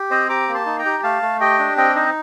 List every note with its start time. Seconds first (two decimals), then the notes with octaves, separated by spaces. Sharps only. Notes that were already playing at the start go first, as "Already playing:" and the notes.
Already playing: G4
0.11 C4 C5 D#5
0.29 G4 A#5 D6
0.48 A#3
0.54 A5 C6
0.66 D#4
0.79 G5 A#5
0.85 G4
1.03 A3 F5 A5
1.22 A3
1.40 G4 D#5 G5
1.59 D4
1.77 C4 D#5 G5
1.95 D#4 C5 D#5